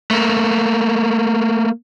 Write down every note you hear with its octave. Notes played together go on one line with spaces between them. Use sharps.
A3 A#3